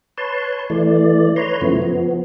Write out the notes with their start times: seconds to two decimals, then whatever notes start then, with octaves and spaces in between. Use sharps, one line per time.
0.18 B4 C#5 A5 C6
0.70 E3 A3 D5
1.36 B4 C#5 A#5 C6
1.61 F#2 C#3 F3 A3 B3 E4
1.82 F3 B3